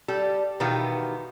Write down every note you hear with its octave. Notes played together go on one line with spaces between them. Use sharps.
G3 G4 A4
B2 D#3 E3 B3 F4 G4